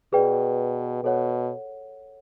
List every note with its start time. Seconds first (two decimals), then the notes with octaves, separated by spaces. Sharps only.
0.13 B2 G#4 B4 D5 G5
1.04 B2 A4 C#5 F#5